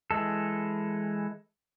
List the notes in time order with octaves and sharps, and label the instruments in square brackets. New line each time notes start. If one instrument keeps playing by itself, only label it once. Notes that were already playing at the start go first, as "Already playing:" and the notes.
[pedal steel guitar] E3 G#3 A4